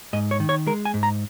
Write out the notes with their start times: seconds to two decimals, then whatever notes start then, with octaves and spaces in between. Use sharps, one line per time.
0.13 G#2 D#5
0.31 C#5
0.40 D#3
0.49 C#5
0.67 G#3 A#4
0.85 G#5
0.94 G#2
1.03 A#5